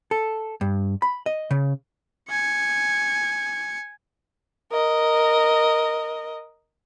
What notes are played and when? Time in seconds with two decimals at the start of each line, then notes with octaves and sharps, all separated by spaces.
0.11 A4
0.61 G2
1.02 B5
1.26 D#5
1.51 C#3
2.29 G#5 C#7
4.71 A#4 D#5